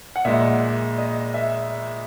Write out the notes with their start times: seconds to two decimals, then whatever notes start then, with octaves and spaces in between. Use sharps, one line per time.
0.16 F#5
0.25 A#1 A#2 G#3 E5
0.98 D#5
1.34 E5